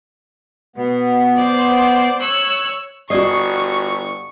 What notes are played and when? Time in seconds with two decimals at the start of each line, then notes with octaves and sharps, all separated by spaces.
0.76 B2 B3
1.37 C5 D5
2.20 C#5 E6 F#6
3.10 G1 F#4 D5 D#5 C#6 D#6 C7